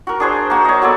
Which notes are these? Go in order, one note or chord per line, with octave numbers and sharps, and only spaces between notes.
F#4 A#4
D4 G#4 C5
A#3 F#4
C#5 D#5
F#3 B3 A4 D5